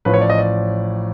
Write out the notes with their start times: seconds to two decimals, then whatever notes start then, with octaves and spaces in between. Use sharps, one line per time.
0.05 A1 A2 F3 B4
0.14 C#5
0.21 D5
0.30 D#5
0.38 D5